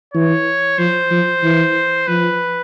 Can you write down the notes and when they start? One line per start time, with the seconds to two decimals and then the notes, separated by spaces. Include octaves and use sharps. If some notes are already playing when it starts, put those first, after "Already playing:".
0.14 E3 C#5
0.78 F3 C5
1.11 F3
1.44 E3
2.07 F3 B4